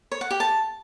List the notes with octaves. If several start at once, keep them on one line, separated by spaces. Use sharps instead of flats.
C#5
F#5
G4
A5